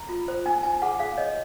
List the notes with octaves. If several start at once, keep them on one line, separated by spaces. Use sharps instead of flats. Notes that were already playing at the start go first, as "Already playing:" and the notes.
Already playing: A#5
F4
C5
D#4 G#5
D#4 G#5
G#4 F#5
G#4 F5
C#5 D#5